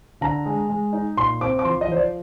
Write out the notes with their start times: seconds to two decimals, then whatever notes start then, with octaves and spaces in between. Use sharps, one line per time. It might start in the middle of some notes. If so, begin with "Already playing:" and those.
0.21 D3 A#5
0.46 G#3
0.70 G#3
0.93 D#4
1.17 A#2 C6
1.41 C4 D6
1.59 D6
1.65 F3 C6
1.81 D#5
1.88 F3 C5
1.96 D5